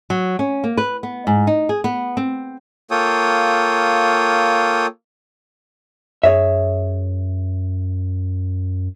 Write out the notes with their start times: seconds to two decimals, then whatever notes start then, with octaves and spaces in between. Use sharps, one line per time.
0.10 F#3
0.39 C#4
0.64 A#3
0.77 B4
1.03 B3
1.27 G#2
1.47 D#4
1.69 G#4
1.84 B3
2.17 C4
2.91 A#3 F4 A4 C#5 G5 D#6
6.23 F#2 G#4 C#5 E5